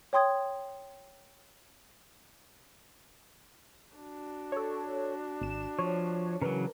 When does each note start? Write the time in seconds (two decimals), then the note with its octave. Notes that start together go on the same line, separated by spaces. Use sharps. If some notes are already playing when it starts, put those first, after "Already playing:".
0.13 C#5 G5 C6 D#6 G#6
3.96 D4 F#4
4.52 A4 C#5
5.41 G#1 E7
5.79 F3 C#5
6.41 C#3 E3 F#3 A#4 B4